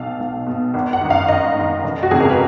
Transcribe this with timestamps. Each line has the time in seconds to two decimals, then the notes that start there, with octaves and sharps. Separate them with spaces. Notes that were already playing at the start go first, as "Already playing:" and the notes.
Already playing: B1 B2 F5
0.20 B1
0.46 B2
0.74 G#1
0.93 F#5
1.01 F#2 D#3
1.10 F5
1.28 G#1 D#5
1.56 F#2 D#3
1.84 F1
2.03 F#4
2.11 F2 C#3 G#4
2.20 A#4
2.30 B4